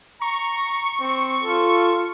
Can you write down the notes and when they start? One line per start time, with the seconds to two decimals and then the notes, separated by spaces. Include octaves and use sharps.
0.22 A#5 C#6
1.00 C4
1.43 F4 A4